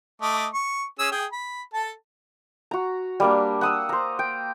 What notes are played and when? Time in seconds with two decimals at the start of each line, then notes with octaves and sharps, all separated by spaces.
0.22 A3 D#5 D6
0.54 C#6
0.99 C#4 G#4 E6
1.12 G#4 G5
1.32 B5
1.73 A4 A5
2.71 F#4 A#5
3.20 G3 A#3 D4
3.61 F#5 D#6 E6
3.89 C5 A#5
4.19 G5